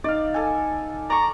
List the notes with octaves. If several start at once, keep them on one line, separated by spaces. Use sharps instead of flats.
D#4 D5 F5
A4 G#5
D5 A#5 C#6